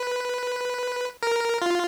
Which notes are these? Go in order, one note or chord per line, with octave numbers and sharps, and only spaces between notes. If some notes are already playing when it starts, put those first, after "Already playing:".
Already playing: B4
A#4
F4